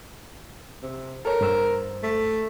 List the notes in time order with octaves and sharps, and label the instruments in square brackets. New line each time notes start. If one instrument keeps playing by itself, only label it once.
[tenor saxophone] C3
[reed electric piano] A4 C#5 [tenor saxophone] A#4
[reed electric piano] G2 C5 E6
[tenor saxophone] A3